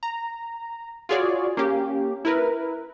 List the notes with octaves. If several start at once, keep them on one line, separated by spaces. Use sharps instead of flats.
A#5
F4 F#4 G#4 C#5 D5
A#3 C#4 G4
E4 A#4 B4